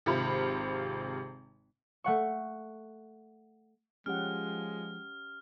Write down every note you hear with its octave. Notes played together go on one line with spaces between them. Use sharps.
G#1 C3 F4 B5
A3 F#5 C#6
F3 G#3 C#4 G4 F#5 F6